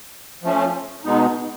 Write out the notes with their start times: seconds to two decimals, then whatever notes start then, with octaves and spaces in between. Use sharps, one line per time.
0.43 F3 A3 C#4
1.05 B2 G#3 B3 D#4